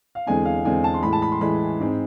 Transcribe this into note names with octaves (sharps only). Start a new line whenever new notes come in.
F5
E2 D3 G#3 C4 G#5
F5
E2 D3 G#3 C4 G#5
A5
C6
A2 E3 G#3 B5
A5
B5
C6
A2 E3 G#3 B5
G#2 G#3 C4